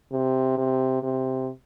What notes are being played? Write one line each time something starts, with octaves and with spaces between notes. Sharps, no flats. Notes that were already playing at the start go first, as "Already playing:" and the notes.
C3
C3
C3